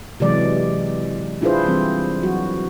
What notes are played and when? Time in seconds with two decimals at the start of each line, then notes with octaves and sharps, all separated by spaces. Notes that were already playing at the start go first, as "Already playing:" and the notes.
0.20 C3 E3 F#3 G#3 D5
1.41 D4 E4 F4 G#4 B4 C5
1.66 E3 G3 C4
2.22 F#3 F#4